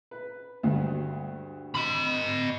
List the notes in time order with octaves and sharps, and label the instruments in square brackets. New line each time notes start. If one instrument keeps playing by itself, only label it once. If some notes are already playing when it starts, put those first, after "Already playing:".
[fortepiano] B4
D2 G2
[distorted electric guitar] D#5 B5